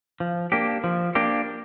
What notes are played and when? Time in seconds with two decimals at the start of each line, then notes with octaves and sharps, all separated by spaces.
0.20 F3
0.52 A#3 D4 G4
0.84 F3
1.15 A#3 D4 G4